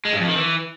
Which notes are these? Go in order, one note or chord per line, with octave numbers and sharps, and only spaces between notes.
G#3
G2
F2
D#3
E3